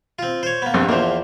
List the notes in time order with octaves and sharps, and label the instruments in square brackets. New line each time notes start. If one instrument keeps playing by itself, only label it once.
[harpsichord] C4 F4
C5 C#5
A#3 B3
[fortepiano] A#1 G2 C4
[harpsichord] E2 F3 [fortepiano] A#3 C5